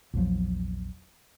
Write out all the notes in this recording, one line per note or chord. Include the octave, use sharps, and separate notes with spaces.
A#1 E2 F3 F#3